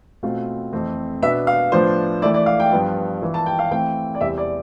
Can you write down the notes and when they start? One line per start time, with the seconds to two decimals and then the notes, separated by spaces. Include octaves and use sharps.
0.23 B2 A3 C4 F4
0.73 F2 E3 A3 C4
1.22 B2 B3 D4 E5
1.47 F5
1.72 A2 F3 B3 D4 F4 C5
2.22 E3 A3 E4 D5
2.34 D5
2.46 F5
2.60 G5
2.72 G2 F3 B3 F4
3.22 E3 B3 F4
3.34 A5
3.46 G5
3.59 F5
3.71 E3 A3 C4 G5
4.15 D5
4.21 E2 C3 E3 G3 C4 E5
4.38 D5